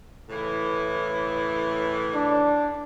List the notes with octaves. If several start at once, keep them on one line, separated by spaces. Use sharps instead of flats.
A2 C#3 E3
D4